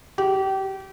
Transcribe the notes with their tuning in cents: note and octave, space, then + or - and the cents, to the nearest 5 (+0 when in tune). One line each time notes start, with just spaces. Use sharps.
G4 -30